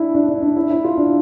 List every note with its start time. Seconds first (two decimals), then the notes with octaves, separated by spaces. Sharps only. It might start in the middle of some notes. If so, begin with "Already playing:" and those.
Already playing: D4 E4
0.14 D4
0.28 D4
0.42 D4
0.56 E4
0.70 E4
0.84 F4
0.98 D4